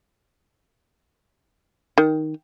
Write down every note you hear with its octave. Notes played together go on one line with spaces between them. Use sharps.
D#3